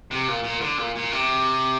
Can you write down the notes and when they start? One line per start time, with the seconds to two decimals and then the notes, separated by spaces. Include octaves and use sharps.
0.11 C3
0.28 A#2
0.44 A#2
0.61 D3
0.78 A#2
0.95 A#2
1.11 C3